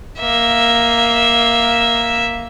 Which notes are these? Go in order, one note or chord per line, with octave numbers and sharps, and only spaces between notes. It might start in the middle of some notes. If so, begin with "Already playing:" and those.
A#3 E5